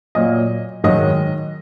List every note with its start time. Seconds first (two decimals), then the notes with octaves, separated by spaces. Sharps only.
0.15 A#2 F#3 D#5
0.84 G#2 D#3 F#3 D#5